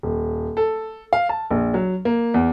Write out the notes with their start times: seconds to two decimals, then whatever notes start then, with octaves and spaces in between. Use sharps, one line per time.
0.03 D#1
0.57 A4
1.13 F5
1.29 A5
1.51 A#1
1.74 F#3
2.05 A#3
2.34 E2